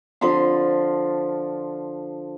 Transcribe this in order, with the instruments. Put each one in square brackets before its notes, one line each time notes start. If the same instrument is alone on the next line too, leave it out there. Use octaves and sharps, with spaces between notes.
[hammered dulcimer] D3 F3 B5 C6